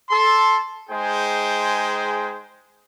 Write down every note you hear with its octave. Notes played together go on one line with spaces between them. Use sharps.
A4 C6
G#3 D#4 G#4 C5 G5